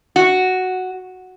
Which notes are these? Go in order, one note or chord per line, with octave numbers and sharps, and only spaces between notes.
F#4